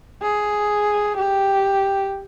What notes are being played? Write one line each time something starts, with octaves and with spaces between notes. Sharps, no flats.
G#4
G4